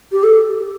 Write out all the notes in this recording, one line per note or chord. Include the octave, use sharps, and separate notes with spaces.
G4
A4